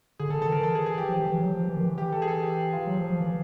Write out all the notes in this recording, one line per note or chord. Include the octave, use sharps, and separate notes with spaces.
D3 G#4
D3 A4
D#3 A4
E3 A#4
A4
G#4
G#4
G4
F3
E3
E3
F#3
F3
E3
D#3
E3
G4
A4
G#4
A4
G4
F4
F#3
F3
F3
E3